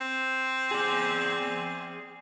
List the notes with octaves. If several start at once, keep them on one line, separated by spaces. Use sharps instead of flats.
C4
G#4 D5